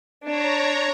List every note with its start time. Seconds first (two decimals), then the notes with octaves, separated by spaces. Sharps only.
0.24 D4 C#5 A#5